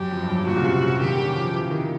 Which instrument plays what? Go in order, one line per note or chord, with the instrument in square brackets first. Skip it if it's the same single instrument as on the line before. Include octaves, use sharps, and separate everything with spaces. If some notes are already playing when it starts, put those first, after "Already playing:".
Already playing: [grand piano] F#2 [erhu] G4
[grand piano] F2
G2
F#2
[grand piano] A#2 [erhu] F#4
[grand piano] C#3
C3
[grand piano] D#3 [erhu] G4
[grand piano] C#3
F3
E3
D#3